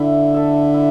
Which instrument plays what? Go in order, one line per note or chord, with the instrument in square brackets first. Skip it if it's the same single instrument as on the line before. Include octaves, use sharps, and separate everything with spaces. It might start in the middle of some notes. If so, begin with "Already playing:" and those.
Already playing: [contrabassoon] D3 [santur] E4
[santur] A4 E5
E4